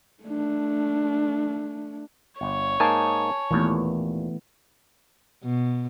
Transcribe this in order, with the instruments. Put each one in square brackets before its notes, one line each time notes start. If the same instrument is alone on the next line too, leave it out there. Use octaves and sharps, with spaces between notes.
[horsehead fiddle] A3 D4
[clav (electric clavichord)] G1 [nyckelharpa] C#5
[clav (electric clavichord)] G#2 A#3 D#4 [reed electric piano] G#5 A5
[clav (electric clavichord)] D#2 A#2 [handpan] E3 A3 B3
[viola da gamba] B2